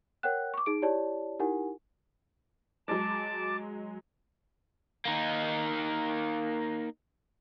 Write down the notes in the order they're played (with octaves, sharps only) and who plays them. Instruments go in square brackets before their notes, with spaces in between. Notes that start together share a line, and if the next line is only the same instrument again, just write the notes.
[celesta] A#4 C#5 F#5 G5 F#6
C#6 D6
D#4 G#4 D7
E4 G4 C#5 D5 A5
D#4 E4 G4 A#4 F#5 G#5
[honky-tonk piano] F#3 G#3 [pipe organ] A5 D6
[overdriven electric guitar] A#3 D#4